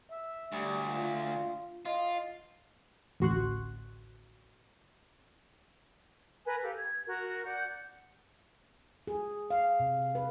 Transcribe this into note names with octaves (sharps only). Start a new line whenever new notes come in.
E5
D2 G3
F4
F4 D#5
A1 D2 F#4 C6 C#6 F#6
A#4 B4 G#5
G4 A4 F5
G#6
F#4 A#4
D5 F#5 G6
G#4
F5
C3
B4